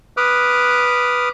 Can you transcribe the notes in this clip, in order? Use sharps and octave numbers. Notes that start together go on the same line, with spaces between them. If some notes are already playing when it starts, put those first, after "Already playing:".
B4 D6 D#6 F6 F#6